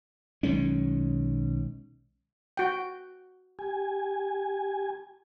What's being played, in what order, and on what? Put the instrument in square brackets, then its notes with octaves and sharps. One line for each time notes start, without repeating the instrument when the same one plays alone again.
[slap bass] B1 D#3 G#3 C#4
[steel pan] F#4 G5
[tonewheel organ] G4 G#5